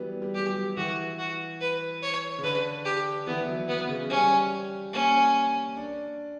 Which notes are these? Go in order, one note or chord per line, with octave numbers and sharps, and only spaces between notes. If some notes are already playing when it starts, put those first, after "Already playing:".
Already playing: E3 F#3 G3 B3
G3
G3 G4
F#3
E3 F#4
F#4
B4
C#5
C#3
D3 B4
G4
E3 B3
E3
F#3
F#3 B3
C#3
G3 C#4
A#3 C#4
D4